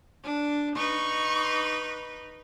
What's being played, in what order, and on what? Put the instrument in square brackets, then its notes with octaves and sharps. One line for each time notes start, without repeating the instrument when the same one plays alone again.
[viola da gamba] D4
[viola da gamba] D#4 B4 [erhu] C#6